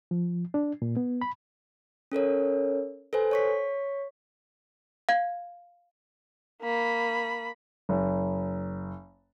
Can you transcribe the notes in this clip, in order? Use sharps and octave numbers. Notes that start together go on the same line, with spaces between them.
F3
D4
A#2
B3
B5
C#4 A4 A#4 C#5
A4 B4 C5 G#5
C#5 C#6 B6
F5 G#6
A#3 B5
F#1